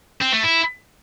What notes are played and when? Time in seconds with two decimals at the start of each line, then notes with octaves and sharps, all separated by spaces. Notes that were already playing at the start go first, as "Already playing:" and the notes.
0.22 C4
0.33 A3
0.44 E4